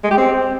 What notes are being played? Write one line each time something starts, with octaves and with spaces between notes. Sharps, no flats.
G#3
G4
C4